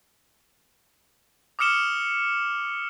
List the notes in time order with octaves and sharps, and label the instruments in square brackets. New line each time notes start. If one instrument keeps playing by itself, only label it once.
[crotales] D6 D#6 F6 C#7 E7 G7